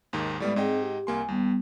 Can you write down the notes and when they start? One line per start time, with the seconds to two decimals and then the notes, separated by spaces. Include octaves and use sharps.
0.13 D#2 G#2 D#3
0.40 A2 G3 G#3 B3 D5
0.56 G#2 C4 G#4 D#5 G5
0.81 G4
1.07 C2 A#3 G#5 C6
1.28 D#2 G3 B3